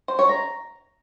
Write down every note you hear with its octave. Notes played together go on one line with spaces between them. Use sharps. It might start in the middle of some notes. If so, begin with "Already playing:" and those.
C5
C#5
A#5